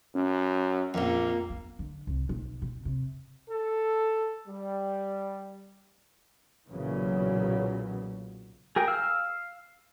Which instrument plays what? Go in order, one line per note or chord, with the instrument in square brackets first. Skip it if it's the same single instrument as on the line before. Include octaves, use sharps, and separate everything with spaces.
[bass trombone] F#2 [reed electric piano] C#4
[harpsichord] A#1 F2 [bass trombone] A#3
[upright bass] B3
D3
C2
B1
B2
C3
[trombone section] A4
G3
[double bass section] B1 A#2 C#3 E3 F#3
[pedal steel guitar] G#4 A#4 G5
F5 E6